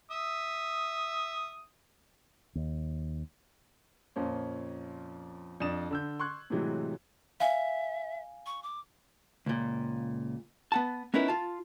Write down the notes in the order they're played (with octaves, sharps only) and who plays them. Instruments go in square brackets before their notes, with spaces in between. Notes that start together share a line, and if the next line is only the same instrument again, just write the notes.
[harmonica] E5 D#6
[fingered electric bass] D#2
[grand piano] F2 A#2 F3 C4 C#4
F2 D4 D5 D#6 E7
D3 E6 G6
C6 C#6 F#6 G#6
A2 C3 E3 F#3 G#3
[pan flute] E5 [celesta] F5 G#5
[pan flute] C#6
D6
[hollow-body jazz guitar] C#2 A#2
B3 F#5 A5
B3 C#4 D#4 E4 A#4 B4
F4 A5